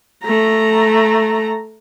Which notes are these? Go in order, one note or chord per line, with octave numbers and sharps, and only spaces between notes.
A3 A#5